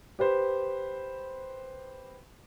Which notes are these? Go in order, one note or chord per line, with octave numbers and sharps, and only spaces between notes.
G4 B4 C5